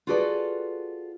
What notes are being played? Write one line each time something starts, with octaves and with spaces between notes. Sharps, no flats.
F4 F#4 G#4 A4 B4 D5